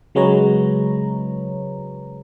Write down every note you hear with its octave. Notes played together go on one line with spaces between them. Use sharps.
C#3 F#3 G#3 B4 C#5 A#5